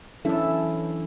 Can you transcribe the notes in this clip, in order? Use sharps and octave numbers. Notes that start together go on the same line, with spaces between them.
E2 E3 F#3 C#4 D4 E4 A4 E5